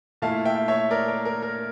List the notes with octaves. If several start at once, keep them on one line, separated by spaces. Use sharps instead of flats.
A#2 A3 E4 F5 A5
E5 G5
C#5 E5
A#4 D5
A#4
A#4
A#4